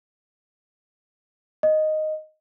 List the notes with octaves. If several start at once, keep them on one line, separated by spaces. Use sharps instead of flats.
D#5